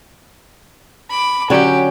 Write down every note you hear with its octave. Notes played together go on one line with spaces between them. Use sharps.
B5 D6
D3 F#3 C#4 G4 G5